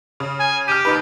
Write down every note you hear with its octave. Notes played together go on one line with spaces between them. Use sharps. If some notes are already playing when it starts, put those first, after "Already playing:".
C#3
G#5
G4 F6 D#7
D#2 D#4 B4